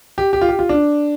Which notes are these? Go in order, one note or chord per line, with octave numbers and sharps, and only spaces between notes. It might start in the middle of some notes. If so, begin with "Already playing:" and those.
G4
G4
F4
G4
F4
D4